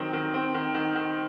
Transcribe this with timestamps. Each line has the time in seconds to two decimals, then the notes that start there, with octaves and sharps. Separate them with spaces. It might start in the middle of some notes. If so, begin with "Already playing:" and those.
Already playing: D#3 F#3 C4
0.13 D#3
0.34 C4
0.54 D#3
0.75 D#3
0.95 D#3